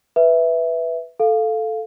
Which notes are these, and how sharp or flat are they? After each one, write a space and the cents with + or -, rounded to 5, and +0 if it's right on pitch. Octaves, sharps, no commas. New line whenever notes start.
B4 +0 E5 +0
A4 +0 F5 +0